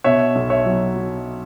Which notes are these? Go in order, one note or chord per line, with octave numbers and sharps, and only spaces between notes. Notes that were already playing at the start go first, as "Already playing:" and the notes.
B2 C#5 E5
B1
C#5 E5
F#3
F#3